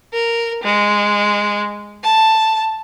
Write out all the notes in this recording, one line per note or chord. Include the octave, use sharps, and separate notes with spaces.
A#4
G#3
A5